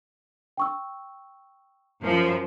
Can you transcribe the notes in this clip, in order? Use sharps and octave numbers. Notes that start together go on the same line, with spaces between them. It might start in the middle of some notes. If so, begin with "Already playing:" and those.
G5 C#6 E6
F#2 F3